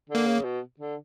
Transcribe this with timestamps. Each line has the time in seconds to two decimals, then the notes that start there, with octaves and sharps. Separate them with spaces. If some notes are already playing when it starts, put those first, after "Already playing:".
0.09 D3
0.15 A#3
0.27 C#3
0.44 B2
0.79 D3